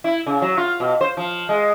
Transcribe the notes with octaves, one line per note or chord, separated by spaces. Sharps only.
E4
C#3
F#3
F4
B2
C5
F3
G#3